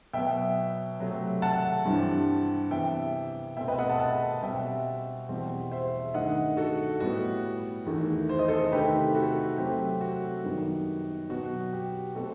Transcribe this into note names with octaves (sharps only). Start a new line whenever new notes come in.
B2 F#3 B3 E5 G5
C3 F#3 A3 C4
F#5 A5
G2 E3 G3 C4
C3 E3 B3 E5 G5
B2 A3 C4 E5 G5
B4 D#5
E5
D#5 F#5
F#5 A5
F#5 A5
B2 G3 C4 E5 G5
E2 B2 G3 C4
C5 E5
G2 D#3 A3 D#5 F#5
F#4 A4
A2 G3 B3 F#4
E2 D#3 A3
C5
D#5
A4 C5
C3 D#3 A3 C4 G4 B4
F#4 A4
C3 F#3 A3 C4 G4
F#4
F#2 D#3 G3 B3
B2 F#3 B3 F#4
G4
B2 A3 C4 F#4 A4